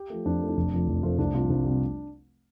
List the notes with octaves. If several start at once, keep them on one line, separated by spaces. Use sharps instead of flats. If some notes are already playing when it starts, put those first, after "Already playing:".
Already playing: G4
F3 A3
F2 D4
F3 A3
D4
F1
F2 F3 A3
F1
F2 F3 A3 F4
C2 D4
C3 G3 F4
C2 D4
C3 G3